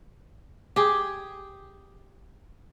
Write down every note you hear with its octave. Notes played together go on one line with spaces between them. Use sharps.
G4 G#4